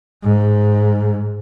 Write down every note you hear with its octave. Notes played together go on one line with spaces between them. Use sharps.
G#2